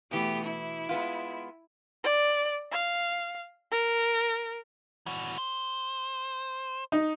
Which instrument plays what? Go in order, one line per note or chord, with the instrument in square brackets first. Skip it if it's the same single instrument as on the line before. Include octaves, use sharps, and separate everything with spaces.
[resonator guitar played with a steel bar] B2 E3 [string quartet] A3 B3 G4
[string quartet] E4
[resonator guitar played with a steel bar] G#3 B3 F4
[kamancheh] D5
F5
A#4
[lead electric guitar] E3 F#4
C5
[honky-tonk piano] D#4